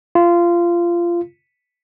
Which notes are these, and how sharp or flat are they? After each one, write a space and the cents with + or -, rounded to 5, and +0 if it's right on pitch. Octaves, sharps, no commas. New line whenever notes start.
F4 -20